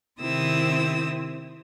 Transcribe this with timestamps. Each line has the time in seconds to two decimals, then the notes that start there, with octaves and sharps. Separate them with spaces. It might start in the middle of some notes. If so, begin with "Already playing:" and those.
0.21 C3 D#3 C4 E4 D#6 E6